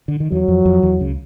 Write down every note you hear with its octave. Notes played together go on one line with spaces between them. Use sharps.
D3
D#3
E2 E3 F#3
F2 F3
F2 F3
E2 E3
C#2 C#3